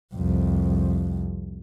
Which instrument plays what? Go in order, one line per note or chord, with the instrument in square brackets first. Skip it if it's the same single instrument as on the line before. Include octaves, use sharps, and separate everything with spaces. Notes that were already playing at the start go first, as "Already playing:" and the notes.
[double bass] C2 F2